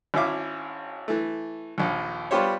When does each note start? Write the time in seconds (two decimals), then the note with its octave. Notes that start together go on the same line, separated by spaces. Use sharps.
0.14 G#1 C#4 E4 E5 F5 D6
1.08 E3 A3
1.78 A#1 D#2
2.31 G3 B3 F4 G4 C5 C#5